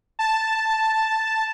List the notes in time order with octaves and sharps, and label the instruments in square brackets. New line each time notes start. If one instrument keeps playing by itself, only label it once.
[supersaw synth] A5